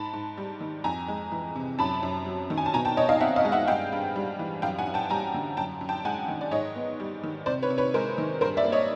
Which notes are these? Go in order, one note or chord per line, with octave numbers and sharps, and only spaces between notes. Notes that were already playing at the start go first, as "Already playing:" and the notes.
Already playing: G#2 A5 B5
G#2
G3
D#3
F2 G#5 A#5
G#3
E3
C3
F#2 A5 B5
F#2
F#3
D#3
G#5
A5
B2 G#5 A#5
G5 A5
B2 C#5 D#5
D#5 F5
C4 E5 F#5
D#5 F5
G#3
E5 F#5
G2 F5 G5
G2
G3
E3
F#2 F5 G5
F#5 G#5
F#2
G5 A5
G3 G#5 A#5
D3
F#2 G5 A5
F#2
G5 A5
G#3 F#5 G#5
D#3
D5
G#2 C#5 D#5
B3
G3
D#3
C3 C5 D5
B4 C#5
C3
B4 C#5
G#3 A#4 C5
D#3
G2 A#4 C5
D5 E5
A#3
C#5 D#5